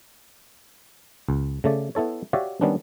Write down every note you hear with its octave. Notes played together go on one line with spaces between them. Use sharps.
C#2
C#3 A3 D5
B3 E4 A4 C#5
F#4 G4 C#5 D5 E5 F5
D#3 G3 B3 C#4 D4